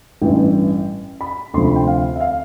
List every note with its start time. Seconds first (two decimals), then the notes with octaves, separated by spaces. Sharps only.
0.22 A1 G2 E3 G5
1.21 B5
1.54 D2 C3 F3 C6
1.65 B5
1.76 G5
1.87 F5
2.16 E5
2.21 F5